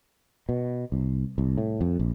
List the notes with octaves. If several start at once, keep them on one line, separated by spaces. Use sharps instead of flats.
B2
C2
C2
A2
F2
A#1